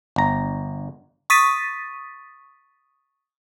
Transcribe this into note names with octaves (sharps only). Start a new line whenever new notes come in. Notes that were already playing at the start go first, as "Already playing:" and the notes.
G1 A#5
C#6 D#6 A6 B6 D#7